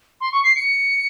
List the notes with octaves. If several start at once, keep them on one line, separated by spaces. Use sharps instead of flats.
C6
C#6
C7
C#7